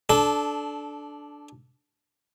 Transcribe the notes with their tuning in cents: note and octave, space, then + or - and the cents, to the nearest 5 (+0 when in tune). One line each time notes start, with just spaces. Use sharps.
D4 +0 A4 -20